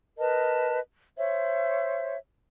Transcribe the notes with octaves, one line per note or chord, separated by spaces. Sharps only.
A#4 B4 D#5 A5
C5 C#5 E5